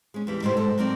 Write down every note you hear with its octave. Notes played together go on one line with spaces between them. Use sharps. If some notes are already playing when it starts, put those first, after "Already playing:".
G#3 C#4
E2 E3 G3
G#2 B2 G3 A3 E4 C5
G#2 A4
F#3 A#3 C4 D5